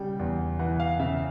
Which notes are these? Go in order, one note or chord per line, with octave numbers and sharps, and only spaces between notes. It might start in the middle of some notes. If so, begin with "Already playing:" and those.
Already playing: C#3 G3 G5
E2
E3 F#5
F5
C#3 E5